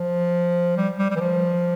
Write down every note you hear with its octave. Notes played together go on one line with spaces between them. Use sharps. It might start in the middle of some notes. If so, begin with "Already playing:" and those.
Already playing: F3
G3
G3
G3
E3
F3